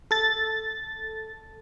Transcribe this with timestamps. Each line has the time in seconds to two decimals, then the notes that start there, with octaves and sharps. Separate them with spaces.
0.11 A4 A6